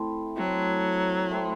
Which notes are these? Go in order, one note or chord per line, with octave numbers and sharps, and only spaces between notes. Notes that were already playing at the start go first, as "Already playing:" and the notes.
Already playing: A3 C4 E4
F#3 A3 C4 E4
A3 C4 E4